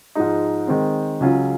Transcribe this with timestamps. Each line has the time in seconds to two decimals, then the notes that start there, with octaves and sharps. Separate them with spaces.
0.15 G#2 F3 G#3 D#4
0.67 D#3 G#3 C4
1.20 C#2 C#3 F#3 C#4 F4